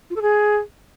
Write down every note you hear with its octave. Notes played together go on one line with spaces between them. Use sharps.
F4
A4
G#4